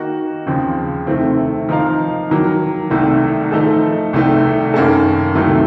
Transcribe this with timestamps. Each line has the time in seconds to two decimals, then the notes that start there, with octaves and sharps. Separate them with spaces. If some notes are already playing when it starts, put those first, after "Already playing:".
Already playing: D#3 A#3 D#4 F#4
0.46 D#2 C#3 F3 C4
1.07 C3 D#3 A3 C4
1.69 F3 A#3 D#4 A#4 F5
2.29 D#3 F#3 A#3
2.90 C2 C3 D#3 A3
3.52 F3 A3 D#4 A4
4.13 C2 C3 D#3 A3
4.74 F#2 D#3 A#3 C#4 A4
5.35 C#2 C3 D#3 F#3 A3